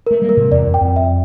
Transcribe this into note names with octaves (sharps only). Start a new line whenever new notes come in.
A3 A#4
G3 A#3
A#4
A2 C3
E2 D5
F2
G5
F2
E5